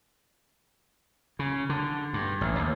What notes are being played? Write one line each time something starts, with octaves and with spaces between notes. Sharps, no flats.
C#3
D3
G2
A1
D#2